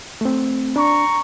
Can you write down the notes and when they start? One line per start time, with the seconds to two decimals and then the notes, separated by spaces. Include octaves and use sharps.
0.21 A3 C4
0.76 D4 A#5 C#6